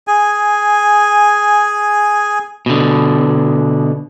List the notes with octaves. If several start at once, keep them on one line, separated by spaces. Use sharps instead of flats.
G#4 G#5
B2 D3